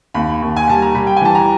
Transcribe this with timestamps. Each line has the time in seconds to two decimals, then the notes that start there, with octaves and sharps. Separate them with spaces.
0.14 D#2 B5
0.42 D#2
0.56 G#5
0.68 G3 A5
0.82 A#5
0.95 G3 B5
1.07 G5
1.16 G#5
1.21 E3 A5
1.35 A#5